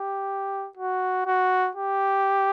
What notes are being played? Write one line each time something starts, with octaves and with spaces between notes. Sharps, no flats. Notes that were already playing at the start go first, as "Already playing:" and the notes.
Already playing: G4
F#4
F#4
G4